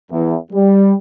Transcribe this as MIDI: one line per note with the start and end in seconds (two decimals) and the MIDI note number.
0.10 0.35 40
0.51 0.93 55